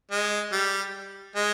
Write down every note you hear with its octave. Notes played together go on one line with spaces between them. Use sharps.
G#3
G3
G#3